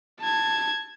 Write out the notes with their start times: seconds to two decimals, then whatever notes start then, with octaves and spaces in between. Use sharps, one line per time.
0.20 A5 G#6